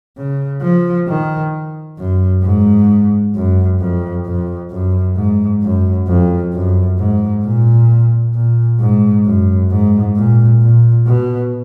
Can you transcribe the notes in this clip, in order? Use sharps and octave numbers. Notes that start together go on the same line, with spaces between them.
C#3
F3
D#3
F#2
G#2
F#2
F2
F2
F#2
G#2
F#2
F2
F#2
G#2
A#2
A#2
G#2
F#2
G#2
A#2
A#2
B2